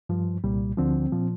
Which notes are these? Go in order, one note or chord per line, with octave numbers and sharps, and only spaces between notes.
G2 F3
C2 A#2 G3
D2 D3 F3 C4
A#2 F3